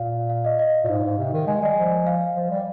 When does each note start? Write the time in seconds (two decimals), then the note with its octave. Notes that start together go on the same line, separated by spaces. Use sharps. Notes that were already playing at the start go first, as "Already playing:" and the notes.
Already playing: A#2 F5
0.30 F5
0.45 D#5
0.59 D#5
0.84 A#2
0.88 G#2 F5
1.03 G#2
1.18 C3
1.33 D#3
1.47 G#3 G#5
1.62 G3 D#5
1.78 F3
2.07 F5
2.36 F3
2.50 G3